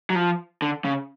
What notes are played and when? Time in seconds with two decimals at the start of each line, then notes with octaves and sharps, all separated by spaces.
0.10 F#3
0.15 F3
0.62 D3
0.85 C#3